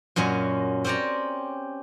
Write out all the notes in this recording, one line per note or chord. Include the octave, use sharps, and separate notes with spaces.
F#2 A#2 F#3 C#4 D#5
C4 C#4 G4 D5 A#5